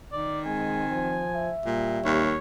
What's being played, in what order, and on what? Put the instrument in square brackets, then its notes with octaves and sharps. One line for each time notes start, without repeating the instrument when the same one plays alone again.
[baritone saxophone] D#3 [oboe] D5
[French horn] G#3 [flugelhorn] C4 [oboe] G#5
[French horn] F3
[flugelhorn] E5
[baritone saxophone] A#2 [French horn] G3
[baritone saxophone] D#2 [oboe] C#5